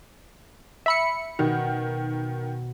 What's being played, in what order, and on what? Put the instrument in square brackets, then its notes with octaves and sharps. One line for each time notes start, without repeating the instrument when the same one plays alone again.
[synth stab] E5 B5 C#7
[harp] B2 [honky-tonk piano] D#3